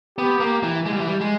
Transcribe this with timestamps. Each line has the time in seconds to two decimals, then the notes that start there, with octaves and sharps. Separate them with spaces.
0.18 B3 G4
0.40 A#3
0.63 E3
0.86 G#3
0.93 G3
1.00 E3
1.07 G3
1.21 G#3